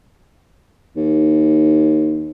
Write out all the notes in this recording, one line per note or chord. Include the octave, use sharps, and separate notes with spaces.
D#2